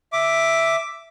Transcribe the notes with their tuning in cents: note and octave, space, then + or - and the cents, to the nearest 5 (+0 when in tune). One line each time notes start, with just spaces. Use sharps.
E5 +0 D6 +0